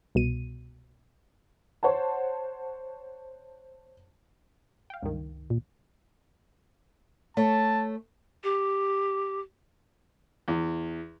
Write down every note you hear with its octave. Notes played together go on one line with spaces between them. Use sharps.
C2 B2 D#7
C5 C#5 F#5 A5
F5 G5
C#2 G2 D#3
A#2
A3 C#5 A5
G4
E2